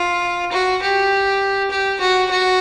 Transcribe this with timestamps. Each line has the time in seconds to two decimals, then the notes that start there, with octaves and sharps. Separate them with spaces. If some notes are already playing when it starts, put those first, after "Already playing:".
Already playing: F4
0.52 F#4
0.82 G4
1.71 G4
2.01 F#4
2.31 F#4